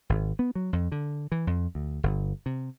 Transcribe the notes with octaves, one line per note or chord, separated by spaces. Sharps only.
G#1
B3
F#3
F2
D3
E3
F2
D2
G1
C3